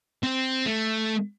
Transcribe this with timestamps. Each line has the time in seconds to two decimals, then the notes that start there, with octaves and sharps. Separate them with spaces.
0.23 C4
0.66 A3